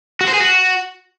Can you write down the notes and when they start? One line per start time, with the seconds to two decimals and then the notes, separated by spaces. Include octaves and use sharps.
0.21 F#4
0.27 C5
0.34 G#4
0.40 F#4